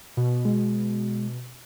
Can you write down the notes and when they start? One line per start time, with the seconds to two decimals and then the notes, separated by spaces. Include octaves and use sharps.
0.17 B2
0.45 G#3